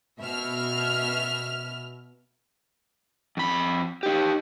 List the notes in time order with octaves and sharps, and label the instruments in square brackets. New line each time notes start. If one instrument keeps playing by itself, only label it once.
[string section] B2 E5 F6
[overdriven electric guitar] F2 B5
D#4 G4